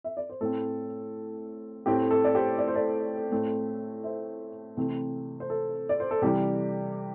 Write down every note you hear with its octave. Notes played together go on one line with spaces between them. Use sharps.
E5
D5
C5
A2 A3 C4 A4
A2 A3 C4 G4
A4
D5
G4 C5
D5
C5
A4 D5
A2 A3 C4
C5 E5
C3 E3 A3 C4
C5
A4
D5
C5
A4
C3 E3 G3 G4